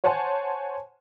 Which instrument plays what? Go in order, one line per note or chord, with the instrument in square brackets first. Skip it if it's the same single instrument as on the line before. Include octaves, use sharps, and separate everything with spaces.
[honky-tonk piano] C5 C#5 F#5 G#5 A5 C6